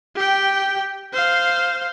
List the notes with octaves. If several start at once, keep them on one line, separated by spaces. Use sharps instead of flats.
G4 G5
C5 F5